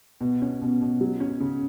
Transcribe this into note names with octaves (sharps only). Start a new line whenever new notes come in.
B2
C#4
B2
B2
F#3
C#4
C#3